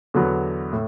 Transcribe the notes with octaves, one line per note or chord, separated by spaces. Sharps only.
E2 D3 F#3 B3
A2